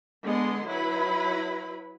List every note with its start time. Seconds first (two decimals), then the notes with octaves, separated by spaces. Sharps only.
0.23 D3 G#3 B3 D#5 C6
0.66 F#3 E4 B4 B5